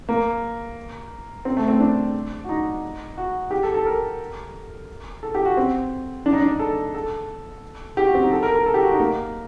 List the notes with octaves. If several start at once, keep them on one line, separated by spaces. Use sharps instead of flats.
A#3
C4
A3
C4
D4
F#4
D#4
F#4
G4
A4
A4
A#4
A4
G4
F#4
C4
D4
D#4
D4
A4
A4
G4
F#4
C4
D#4
A4
A#4
A#4
A4
G4
F#4
D#4
A#3